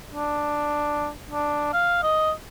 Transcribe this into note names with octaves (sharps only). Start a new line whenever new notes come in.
D4
D4
F5
D#5